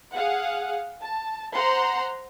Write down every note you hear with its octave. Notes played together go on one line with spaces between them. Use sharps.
G#4 F5 F#5
A5
C5 F#5 A#5 C6